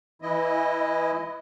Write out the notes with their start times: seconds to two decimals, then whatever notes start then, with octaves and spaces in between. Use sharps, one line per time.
0.22 E3 E4 D#5